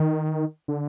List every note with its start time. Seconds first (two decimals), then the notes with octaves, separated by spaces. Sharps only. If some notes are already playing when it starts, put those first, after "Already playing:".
Already playing: D#3
0.68 D3